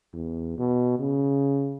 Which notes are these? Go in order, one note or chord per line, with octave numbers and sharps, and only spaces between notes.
E2
B2
C#3